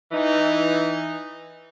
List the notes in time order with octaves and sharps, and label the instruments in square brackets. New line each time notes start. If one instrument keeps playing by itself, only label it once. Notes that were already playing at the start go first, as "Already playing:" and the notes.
[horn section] E3 D#4